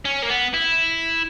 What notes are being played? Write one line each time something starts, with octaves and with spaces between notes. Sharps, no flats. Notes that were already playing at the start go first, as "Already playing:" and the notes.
C#4
A#3
B3
E4